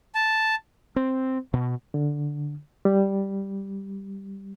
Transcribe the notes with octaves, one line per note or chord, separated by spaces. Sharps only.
A5
C4
B2
D3
G3